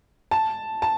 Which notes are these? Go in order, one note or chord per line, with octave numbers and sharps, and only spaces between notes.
A5
A5